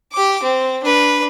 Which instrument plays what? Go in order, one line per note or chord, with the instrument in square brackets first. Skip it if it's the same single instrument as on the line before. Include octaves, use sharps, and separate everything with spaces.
[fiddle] G4 D6
C4
D4 B4